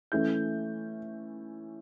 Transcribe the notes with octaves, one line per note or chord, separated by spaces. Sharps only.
E3 A3 C#4 G6